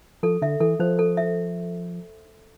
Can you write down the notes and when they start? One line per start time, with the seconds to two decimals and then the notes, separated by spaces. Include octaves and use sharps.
0.23 F3 A4
0.42 D3 E5
0.60 E3 A4
0.80 F3 C5
0.99 A4
1.17 E5